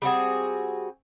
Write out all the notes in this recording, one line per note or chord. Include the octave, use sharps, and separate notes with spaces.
G3 C4 F#4 G#4